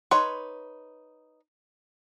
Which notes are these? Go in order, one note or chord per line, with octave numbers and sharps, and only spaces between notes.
D#4 B4 C#5 C6